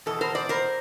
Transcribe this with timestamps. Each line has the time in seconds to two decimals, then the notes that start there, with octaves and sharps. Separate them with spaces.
0.06 E2 B2 A4
0.21 A#4 C5
0.35 C5 D5
0.49 A#4 C5